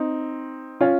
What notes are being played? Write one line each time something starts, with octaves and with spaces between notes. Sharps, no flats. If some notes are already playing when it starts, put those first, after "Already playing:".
Already playing: C4 D#4
C#4 F4